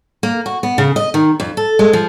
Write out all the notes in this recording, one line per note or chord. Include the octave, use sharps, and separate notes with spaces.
A#3
F#4
B3
C#3
D#5
D#3
F2
A4
G#3
F3